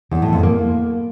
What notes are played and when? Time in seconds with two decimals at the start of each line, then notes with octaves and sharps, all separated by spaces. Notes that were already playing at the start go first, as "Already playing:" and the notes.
0.12 E2
0.22 A2
0.33 F2
0.43 A#3